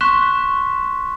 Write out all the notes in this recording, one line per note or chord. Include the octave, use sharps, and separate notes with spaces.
C6 C#6 F#6 B6 E7